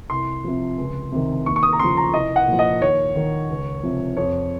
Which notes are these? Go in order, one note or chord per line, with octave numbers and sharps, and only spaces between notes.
C2 C6
C3 F3
C#2
C3 D#3
D#2 C#6
C#6
D#6
A#5
C#3 F3 C6
A#5
C2 D#5
F#5
A#2 F3
D#5
D#2 C#5
D#3
C#2
C3 F3
F2 C#5